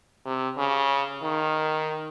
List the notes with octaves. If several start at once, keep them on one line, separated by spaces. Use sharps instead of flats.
C3
C#3
D#3